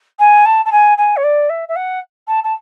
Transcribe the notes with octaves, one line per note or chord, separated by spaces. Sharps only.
G#5
A5
A5
G#5
G#5
C#5
D5
E5
E5
F#5
A5
A5